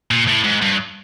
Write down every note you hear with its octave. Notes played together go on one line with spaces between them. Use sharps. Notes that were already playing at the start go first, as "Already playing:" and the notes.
A#2
A2
G#2
G2